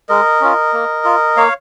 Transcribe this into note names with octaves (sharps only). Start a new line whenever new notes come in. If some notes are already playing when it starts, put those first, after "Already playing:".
G#3 A#4 D#5
C#4 F4
A#3
F4
A#3 C#5 F5